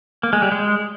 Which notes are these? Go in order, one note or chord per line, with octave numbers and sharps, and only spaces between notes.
A#3
G#3
G3
G#3